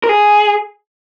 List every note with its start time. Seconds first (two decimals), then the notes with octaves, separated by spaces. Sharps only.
0.04 A#4
0.09 G#4